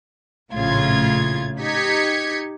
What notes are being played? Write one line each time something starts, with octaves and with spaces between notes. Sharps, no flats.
A#1 A2 C#3 F4 G#6
D#4 G4 G#6 B6 C#7